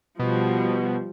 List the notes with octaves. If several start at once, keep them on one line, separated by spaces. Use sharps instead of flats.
B2 F3 G3